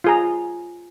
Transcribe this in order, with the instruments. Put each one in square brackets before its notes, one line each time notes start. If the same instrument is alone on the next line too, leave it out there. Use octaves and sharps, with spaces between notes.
[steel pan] F4 G#4 A#5